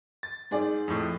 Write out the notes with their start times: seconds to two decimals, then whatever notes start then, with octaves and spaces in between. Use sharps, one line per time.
0.23 A6
0.51 G#2 G#4 D5
0.88 F2 A2